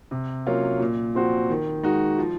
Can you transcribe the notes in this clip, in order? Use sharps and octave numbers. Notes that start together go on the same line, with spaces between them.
C3
F#3 A#3 C#4 F4
A#2
F3 C4 F#4
D#3
G#3 D#4 F#4
F3